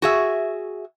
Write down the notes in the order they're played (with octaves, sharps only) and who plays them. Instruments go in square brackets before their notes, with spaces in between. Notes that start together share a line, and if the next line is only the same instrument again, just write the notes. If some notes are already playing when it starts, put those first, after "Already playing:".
[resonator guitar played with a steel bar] F#4 G#4 E5